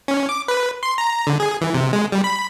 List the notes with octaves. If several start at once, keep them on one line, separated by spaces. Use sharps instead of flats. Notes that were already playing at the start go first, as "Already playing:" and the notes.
C#4
D6
B4
C6
A#5
D3
G#4
E3
C3
G#3
G3
B5